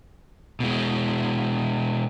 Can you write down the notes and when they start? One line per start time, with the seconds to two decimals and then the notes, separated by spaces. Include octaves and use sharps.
0.60 B2 G#3